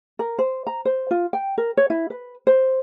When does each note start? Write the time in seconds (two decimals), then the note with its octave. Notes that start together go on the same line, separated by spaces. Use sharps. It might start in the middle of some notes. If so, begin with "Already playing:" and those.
0.19 A#4
0.39 C5
0.67 A#5
0.85 C5
1.11 F4
1.33 G5
1.58 A#4
1.77 C#5
1.90 E4
2.10 B4
2.47 C5